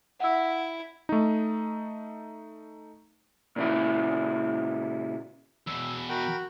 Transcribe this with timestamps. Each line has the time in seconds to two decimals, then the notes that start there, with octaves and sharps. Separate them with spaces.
0.20 E4 F#5 E6
1.09 A3 D#4
3.56 A#2 C#3 E4
5.67 E2 B2 E6
6.09 F#4 A#4 G5 B5